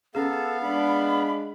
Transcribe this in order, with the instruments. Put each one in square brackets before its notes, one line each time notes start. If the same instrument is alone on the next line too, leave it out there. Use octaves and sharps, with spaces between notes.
[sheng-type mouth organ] B3 F5 [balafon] C#4 G#4 [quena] A4
[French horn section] G#3 D4 [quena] B5